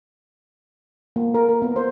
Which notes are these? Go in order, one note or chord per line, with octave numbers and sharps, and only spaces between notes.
A#3
A#4
A#4
B3
C5